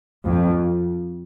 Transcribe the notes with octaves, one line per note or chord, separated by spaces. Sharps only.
F2